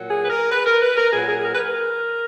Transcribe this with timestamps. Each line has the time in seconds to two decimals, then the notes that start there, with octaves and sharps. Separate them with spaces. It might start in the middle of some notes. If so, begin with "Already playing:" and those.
Already playing: A#2 F#3
0.09 G#4
0.25 B4
0.30 A#4
0.51 B4
0.66 A#4
0.82 B4
0.97 A#4
1.13 A#2 F#3 G#4
1.28 G#4
1.39 G#4
1.44 A#4
1.55 B4
1.60 A#4